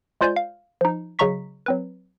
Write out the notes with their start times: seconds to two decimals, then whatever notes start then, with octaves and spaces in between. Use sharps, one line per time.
0.21 G#3 F4 C5 D5 G#5 G6
0.36 F5
0.81 F3 D#4
1.19 C#3 F#3 D#5 A#5 C#6 B6
1.66 F#3 C4 B4